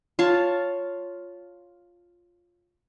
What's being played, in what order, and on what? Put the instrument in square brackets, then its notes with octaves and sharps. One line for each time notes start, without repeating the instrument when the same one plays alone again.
[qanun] F4 C#5 A5